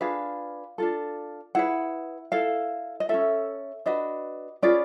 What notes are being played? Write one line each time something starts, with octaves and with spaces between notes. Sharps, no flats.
D4 F4 G#4 B4 F5
D4 F4 A4
E4 G#4 B4 F#5
E4 A4 F5
D#5
C#4 F4 A4 E5
D4 F#4 B4 D#5
C#4 F4 G#4 B4 D5